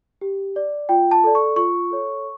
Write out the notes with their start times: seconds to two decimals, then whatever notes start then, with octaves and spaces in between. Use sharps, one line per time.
0.21 G4
0.56 D5
0.89 F4 G5
1.11 A5
1.24 A4 D5
1.35 C#6
1.56 F4 C#6
1.91 A4 C#5